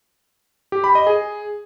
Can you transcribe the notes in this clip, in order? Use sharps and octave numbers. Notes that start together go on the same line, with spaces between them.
G4
B5
D#5
G#4